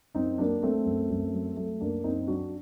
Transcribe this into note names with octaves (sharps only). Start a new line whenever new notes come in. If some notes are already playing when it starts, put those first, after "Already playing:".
F#2 C4 D#4
F#3 A#3 D4
F#3 A3 C4
F#2
F#2
F#3
F#3 A3
F#2 A#3 D4
F#2 C4 D#4
F#3 D4 F#4